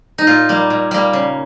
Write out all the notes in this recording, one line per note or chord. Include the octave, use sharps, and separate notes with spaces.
D#4
A#2 F4
G3 A#3
A#2
G3 A#3
C#3